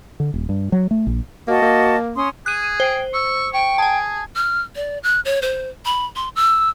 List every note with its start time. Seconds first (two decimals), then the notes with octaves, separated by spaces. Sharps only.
0.20 D3
0.34 D#1
0.49 G2
0.72 F#3
0.91 A3
1.07 A#1
1.48 A#3 F#4 D#5 A5
1.62 A#3
2.16 C#4 C6 D#6
2.46 G#4 F#6 D#7
2.80 C5 G5
3.14 C#6 E6
3.53 G5 C#6
3.78 G#4 G#5 A5
4.36 F6
4.76 D5
5.03 F#6
5.25 C#5
5.42 C5
5.85 B5
6.16 C6
6.36 E6